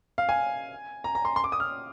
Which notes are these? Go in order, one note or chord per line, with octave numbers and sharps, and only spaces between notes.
F5
G#5
A#5
A#5
C6
C6
D6
D#6
F6